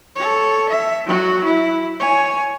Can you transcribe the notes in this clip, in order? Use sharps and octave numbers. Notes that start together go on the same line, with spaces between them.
A4 C#5
E5
F#3 F#4
E4
C#5 G#5